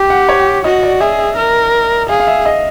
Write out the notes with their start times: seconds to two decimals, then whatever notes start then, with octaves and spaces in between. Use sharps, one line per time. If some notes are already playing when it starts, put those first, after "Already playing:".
Already playing: G4 G5
0.10 F#5
0.29 C#5
0.64 F#4 D#5
0.83 D5
1.00 G#4 E5
1.19 E5
1.37 A#4
2.09 G#4 F5
2.20 F5
2.27 E5
2.46 D#5